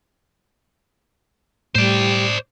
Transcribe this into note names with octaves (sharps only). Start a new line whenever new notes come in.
A2 G3 C5 D5